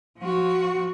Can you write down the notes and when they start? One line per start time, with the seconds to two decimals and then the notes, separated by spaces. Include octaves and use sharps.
0.19 F3 F#4